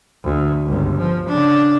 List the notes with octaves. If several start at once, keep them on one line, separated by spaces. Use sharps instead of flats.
D2
G1 C#2
F3
C#3 D4